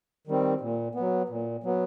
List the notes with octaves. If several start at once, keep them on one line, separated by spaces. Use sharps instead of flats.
D#3 G3 C4
A#2
F#3 B3
A#2
F#3 B3